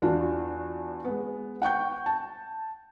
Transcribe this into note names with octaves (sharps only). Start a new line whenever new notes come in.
E2 D4 F4 F#4
G#3 B3
F#5 G5 C#6 G6
A5